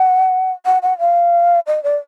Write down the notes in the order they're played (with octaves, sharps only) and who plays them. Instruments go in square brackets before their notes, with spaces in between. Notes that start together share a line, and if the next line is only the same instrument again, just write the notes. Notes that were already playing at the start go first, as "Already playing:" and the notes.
Already playing: [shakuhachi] F#5
F#5
F#5
F5
D#5
D5